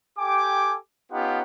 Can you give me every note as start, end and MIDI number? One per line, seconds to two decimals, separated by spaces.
0.17 0.76 67
0.17 0.76 69
0.17 0.76 79
0.17 0.76 80
0.17 0.76 86
1.12 1.42 59
1.12 1.42 61
1.12 1.42 63
1.12 1.42 65
1.12 1.42 67
1.12 1.42 78